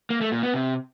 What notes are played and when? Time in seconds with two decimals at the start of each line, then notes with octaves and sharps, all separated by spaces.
0.10 A#3
0.21 A3
0.32 A#2
0.43 B3
0.54 C3